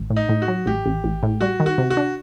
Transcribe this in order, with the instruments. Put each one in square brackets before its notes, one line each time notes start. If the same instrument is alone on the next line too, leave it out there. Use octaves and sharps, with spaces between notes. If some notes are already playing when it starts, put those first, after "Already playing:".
Already playing: [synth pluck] A1
A2
[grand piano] D#4
[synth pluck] A2
[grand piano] F#4
[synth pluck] F#3
[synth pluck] A1 [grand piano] G4
[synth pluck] A1
A1
A2
[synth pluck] G3 [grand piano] F#4
[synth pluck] D#3
[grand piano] F#4
[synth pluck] C3
[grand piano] F#4
[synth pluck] D4